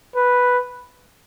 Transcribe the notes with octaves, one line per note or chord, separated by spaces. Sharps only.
B4